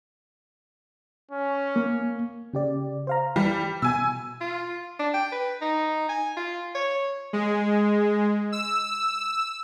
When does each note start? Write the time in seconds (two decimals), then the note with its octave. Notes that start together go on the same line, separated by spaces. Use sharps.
1.31 C#4
1.76 A#3
2.53 C#3 G4 D5
3.07 C5 F5 A#5
3.36 E3 G3
3.82 B2 G#5 E6
4.41 F4
4.99 D4
5.14 G5
5.32 B4
5.62 D#4
6.09 G#5
6.37 F4
6.75 C#5
7.33 G#3
8.52 E6